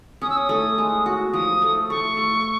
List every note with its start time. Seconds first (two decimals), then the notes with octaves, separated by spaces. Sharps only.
0.22 C#4 D#6
0.30 E6
0.37 D#6
0.49 A3
0.78 G#3
1.06 F#4
1.33 F3 D#6
1.62 A3
1.90 A3 C#6
2.17 A3